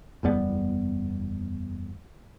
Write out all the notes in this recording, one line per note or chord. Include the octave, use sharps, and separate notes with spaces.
F#1 E2 G3 B3